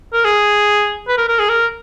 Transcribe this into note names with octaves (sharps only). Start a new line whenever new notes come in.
A#4
G#4
B4
A#4
A#4
G#4
A#4